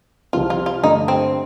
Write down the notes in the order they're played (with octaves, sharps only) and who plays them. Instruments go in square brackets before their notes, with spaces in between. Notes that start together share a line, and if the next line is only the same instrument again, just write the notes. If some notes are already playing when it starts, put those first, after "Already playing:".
[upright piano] C2 C3 F3 C4 [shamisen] F4
[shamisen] F4
F4
[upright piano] G2 D3 A3 [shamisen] D#4
[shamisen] C4